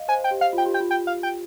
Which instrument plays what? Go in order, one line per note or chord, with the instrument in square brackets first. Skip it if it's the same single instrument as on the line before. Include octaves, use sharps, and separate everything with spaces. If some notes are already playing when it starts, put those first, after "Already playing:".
Already playing: [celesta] D#5 F5
[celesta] C5 [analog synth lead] G#5
[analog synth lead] G5
[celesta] G4
[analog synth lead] F5
[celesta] F4
[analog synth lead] G5
[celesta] G4
[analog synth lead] G5
[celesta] F4
[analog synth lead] G5
F5
G5